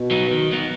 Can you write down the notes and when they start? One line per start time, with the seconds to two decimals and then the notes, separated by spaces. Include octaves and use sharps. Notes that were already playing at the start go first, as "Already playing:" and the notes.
Already playing: B2
0.11 F#3 B3 D#4
0.31 D#3
0.51 F#3 B3 D#4